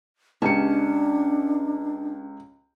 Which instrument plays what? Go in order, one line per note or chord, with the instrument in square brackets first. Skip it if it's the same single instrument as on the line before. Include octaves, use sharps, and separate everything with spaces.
[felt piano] C#2 G4 C#7 [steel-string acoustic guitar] C#4 A5 [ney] D4